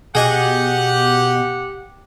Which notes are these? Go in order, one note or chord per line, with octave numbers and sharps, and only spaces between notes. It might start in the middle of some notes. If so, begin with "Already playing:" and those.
B2 G4 G#4 D#5 F#5 G#5